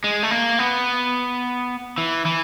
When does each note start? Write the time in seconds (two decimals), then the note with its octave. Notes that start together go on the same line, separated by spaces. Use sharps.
0.04 G#3
0.23 A3
0.31 A#3
0.59 B3
1.98 E3
2.25 E3